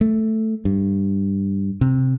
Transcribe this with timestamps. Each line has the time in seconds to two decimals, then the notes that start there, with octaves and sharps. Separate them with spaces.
0.01 A3
0.65 G2
1.81 C3